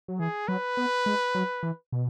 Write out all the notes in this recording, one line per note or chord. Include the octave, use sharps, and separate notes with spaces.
F#3
E3 G#4
F#3 B4
B3
G#3
F#3
E3
B2